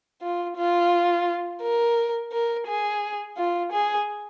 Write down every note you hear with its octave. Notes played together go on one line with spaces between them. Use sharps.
F4
F4
A#4
A#4
G#4
F4
G#4